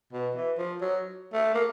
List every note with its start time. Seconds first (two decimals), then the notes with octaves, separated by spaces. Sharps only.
0.13 B2
0.35 E3
0.58 F3
0.81 F#3
1.33 A3
1.54 A#3